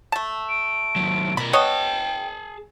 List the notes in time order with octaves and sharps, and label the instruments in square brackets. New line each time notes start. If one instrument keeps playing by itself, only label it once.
[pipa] A3 A5
[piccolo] D7
[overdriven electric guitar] D#2 F#3
[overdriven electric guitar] B2 A#4 [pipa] B5
[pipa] B3 C#5 D#5 [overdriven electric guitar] G#4 A5 [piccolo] G5